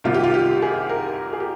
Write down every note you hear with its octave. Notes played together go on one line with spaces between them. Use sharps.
C2 C3 D#3 F4
G4
F4
G4
G#4
A#4
G#4
G4